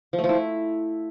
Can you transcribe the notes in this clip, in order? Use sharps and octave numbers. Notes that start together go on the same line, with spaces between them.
F3
A3
F3
E4